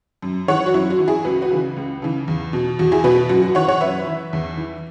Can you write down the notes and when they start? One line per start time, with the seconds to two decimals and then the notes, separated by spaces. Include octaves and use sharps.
0.22 F#2
0.48 E3 C#5 F#5
0.66 F#4
0.74 F#2 E4
0.90 F#4
0.99 E3
1.08 E4 G#4
1.25 C#2 F#4 B4
1.42 F#4 B4
1.51 C#3 E3
1.76 C#2
2.02 C#3 E3
2.28 E2
2.53 B2
2.79 E2 F#4
2.92 E4 G#4
3.04 B2 F#4 B4
3.29 F#2 F#4
3.42 F#4
3.55 E3 C#5 F#5
3.68 C#5 F#5
3.81 F#2 B4 E5
4.07 E3
4.33 E2
4.57 E3